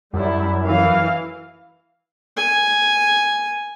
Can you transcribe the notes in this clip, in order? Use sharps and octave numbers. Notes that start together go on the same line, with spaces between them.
F#2 G3 E4
E3 F5
G#5